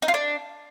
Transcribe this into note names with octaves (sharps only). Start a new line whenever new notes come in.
D#4
F4
D4